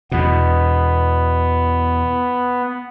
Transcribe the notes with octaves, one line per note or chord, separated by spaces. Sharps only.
E2 B2 B3